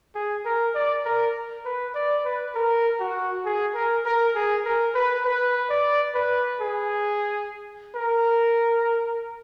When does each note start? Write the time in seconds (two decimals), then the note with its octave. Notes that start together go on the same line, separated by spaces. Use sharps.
0.15 G#4
0.45 A#4
0.75 D5
1.05 A#4
1.65 B4
1.95 D5
2.25 B4
2.55 A#4
3.00 F#4
3.45 G#4
3.75 A#4
4.06 A#4
4.35 G#4
4.65 A#4
4.95 B4
5.25 B4
5.70 D5
6.15 B4
6.61 G#4
7.96 A#4